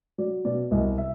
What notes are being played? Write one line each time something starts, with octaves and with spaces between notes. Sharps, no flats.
F#3 D5
B2 D5
C2 D#5
E5